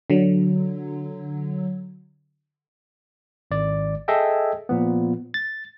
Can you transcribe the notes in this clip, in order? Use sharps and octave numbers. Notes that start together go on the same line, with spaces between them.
D3 F#3
G#1 D5
G#4 A4 D#5 E5 G5
A#2 F3 B3
A6